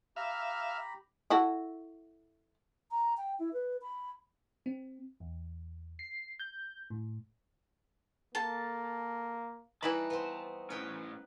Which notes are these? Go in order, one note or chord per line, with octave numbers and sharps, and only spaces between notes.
G4 E5 F5 A#5 B5
E4 F#4 A4
A#5
G5
E4
B4
B5
C4
E2
C7
G6
A2
A#3 A4 A5
E3 G3 D#4 E4 F#4 A5 B5
B3 C4
A2 C#4 B4 G5